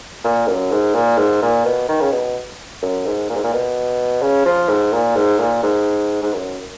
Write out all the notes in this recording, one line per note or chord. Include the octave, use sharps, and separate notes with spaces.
A#2
F#2
G#2
A#2
G#2
A#2
B2
D#3
C#3
B2
F#2
G#2
A#2
G#2
A#2
B2
C#3
F3
G#2
A#2
G#2
A#2
G#2
G#2
F#2